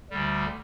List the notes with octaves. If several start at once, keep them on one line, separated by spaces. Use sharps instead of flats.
D2 D3 G3